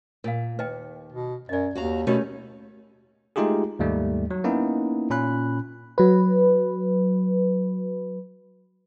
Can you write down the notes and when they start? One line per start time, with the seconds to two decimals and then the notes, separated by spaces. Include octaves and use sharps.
0.24 A#2 A#4 F5
0.59 D#2 B4 D#5 G5
1.12 B2
1.49 F#2 D5 D#5
1.75 D#2 F#4 F5 A#5
2.07 B2 A3 C#4 D#4 G4 A#4 C#5
3.36 G#3 A3 D#4 F4 G4 G#4
3.79 D#2 G#2 G3 A3
4.31 F#3
4.44 A#3 B3 C#4 D#4 E4
5.10 A#2 C#4 B5 F#6
5.98 F#3 B4